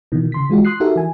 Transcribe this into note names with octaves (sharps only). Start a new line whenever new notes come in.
B2 D#3 E3
C#3 C6 B6
E3 G#3 F4 F#4
C6 D#6 F#6 C7
D#4 F#4 G4 A4 A#4 E5
E3 G#5